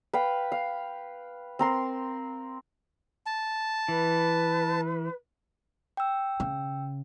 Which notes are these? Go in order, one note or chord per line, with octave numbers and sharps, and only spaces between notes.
B4 F5 G5
F5
C4 A#4 C6
A5
E3 B4
G5 E6
C#3